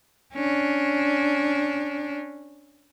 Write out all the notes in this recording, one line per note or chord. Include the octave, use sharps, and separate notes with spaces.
C#4 D4